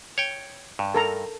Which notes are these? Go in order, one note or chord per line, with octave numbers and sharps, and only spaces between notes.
C#5 G5
G2
A4 A#4 A#5